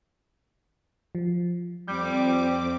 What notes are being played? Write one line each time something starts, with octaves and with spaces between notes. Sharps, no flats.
F3
F2 G3 C4 D6 G6